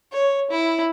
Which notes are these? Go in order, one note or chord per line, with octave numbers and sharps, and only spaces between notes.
C#5
E4